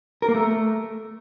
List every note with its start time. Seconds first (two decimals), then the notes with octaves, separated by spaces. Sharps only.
0.22 A#4
0.28 A#3
0.35 A3